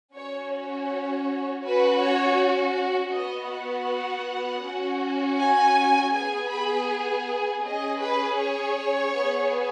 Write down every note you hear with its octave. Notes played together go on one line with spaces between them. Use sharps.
C#4 F#4 C#5
C#5
C#4 F#4 B4
C#5
B3 F#4 D#5
F#5
C#4 F#4
G#5
B3 G#4 G#5
B5
G#5
C#4 G#4 D#5
B4
C#5
B3 G#4